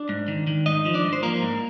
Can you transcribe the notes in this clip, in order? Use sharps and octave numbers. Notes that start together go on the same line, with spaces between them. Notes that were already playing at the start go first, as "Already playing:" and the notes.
Already playing: D4 D5
G#2
D#3
D#3
G#2 D#4 D#5
F3
D4 D5
G#2
C5
F3 A#3 A#4
G#2